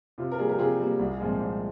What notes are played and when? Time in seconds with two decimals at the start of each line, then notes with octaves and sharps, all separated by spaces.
0.18 C3 F4
0.32 A#4
0.38 G3 A#3 F4 G#4
0.49 G4 A#4
0.58 C3 F4 G#4
0.80 G3 A#3
0.99 C2
1.20 A#2 F3 G#3 C4
1.40 C2